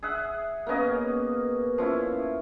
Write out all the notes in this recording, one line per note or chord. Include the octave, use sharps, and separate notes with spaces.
G#4 E5 F#5
A#3 B3 C#4 D#5
F3 C#4 E4